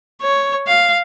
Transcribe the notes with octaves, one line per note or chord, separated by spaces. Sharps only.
C#5
F5